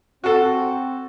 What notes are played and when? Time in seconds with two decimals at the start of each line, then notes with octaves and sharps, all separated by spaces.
0.24 C4 F#4 A4